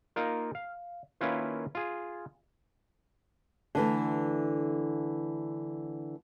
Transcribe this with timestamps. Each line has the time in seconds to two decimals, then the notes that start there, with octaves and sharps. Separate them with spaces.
0.16 A#3 D#4 F4 A#4
0.55 F5
1.21 D#3 A#3 C#4 E4 F4 B4
1.75 F4 G#4
3.75 D3 E3 A3